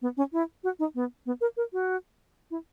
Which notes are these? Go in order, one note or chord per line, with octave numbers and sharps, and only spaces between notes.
B3
C#4
E4
F#4
D#4
B3
B3
A#4
A#4
F#4
E4